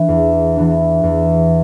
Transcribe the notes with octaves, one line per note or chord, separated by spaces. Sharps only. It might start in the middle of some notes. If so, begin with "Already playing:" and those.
Already playing: E3 B3 D4
E2
E3 B3 D4
E2